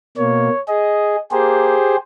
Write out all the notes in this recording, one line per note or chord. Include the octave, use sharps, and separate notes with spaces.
B2 A#3 C#5
G#4 D#5
A#3 G4 G#4 C5